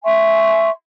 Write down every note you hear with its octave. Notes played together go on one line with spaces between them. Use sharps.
E5 G#5 C6 C#6